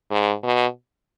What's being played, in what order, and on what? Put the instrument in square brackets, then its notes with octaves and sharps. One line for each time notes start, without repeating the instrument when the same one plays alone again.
[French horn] G#2
B2